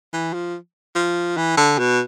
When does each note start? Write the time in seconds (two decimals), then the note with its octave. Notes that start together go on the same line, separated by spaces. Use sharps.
0.13 E3
0.34 F3
0.96 F3
1.37 E3
1.57 D3
1.79 B2